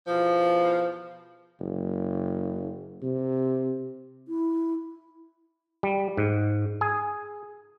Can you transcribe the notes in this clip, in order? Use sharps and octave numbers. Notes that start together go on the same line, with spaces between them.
E2 B2 F3
F#1
C3
E4
G3
G#2
G#4